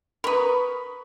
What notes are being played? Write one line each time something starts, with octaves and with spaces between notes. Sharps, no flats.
A#4 B4 B5 C#6 D#6